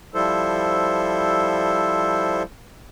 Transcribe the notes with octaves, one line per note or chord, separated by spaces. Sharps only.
F3 G3 E4 A4 C5